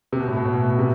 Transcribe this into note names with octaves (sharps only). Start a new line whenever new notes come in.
C3
B2
A2
B2
A2
B2
A2
B2
C3